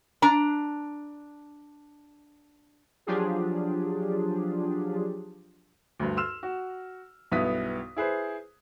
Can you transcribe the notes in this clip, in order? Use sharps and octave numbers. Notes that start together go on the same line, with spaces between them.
D4 A#5
F3 F#3 D4 F4 G4 G#4
D2 G2
C6 E6 F6 E7
F#4
B1 G2 B3 E4 D#6 B6
E4 G#4 B4 C5